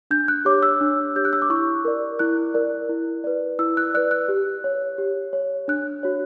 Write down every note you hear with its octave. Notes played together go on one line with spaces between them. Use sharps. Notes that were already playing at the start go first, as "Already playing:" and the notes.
D4 G6
F#6
G4 C#5 D6
E6
D4
G4 C#5 G6
F#6
E6
D6
E4 C#6
A#4 D5
E4 F#6
A#4 D5
E4
B4 D5
E4 E6
F#6
B4 D5 F#6
F#6
G4
C#5
G4
C#5
D4 F#6
F#4 C#5